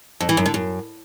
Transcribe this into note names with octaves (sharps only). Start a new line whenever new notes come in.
F2
E3
F#2
D3
F#2